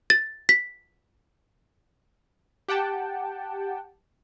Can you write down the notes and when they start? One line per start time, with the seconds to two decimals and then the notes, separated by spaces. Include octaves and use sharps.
0.10 A6
0.49 B6
2.68 G4 F#5 G5 A5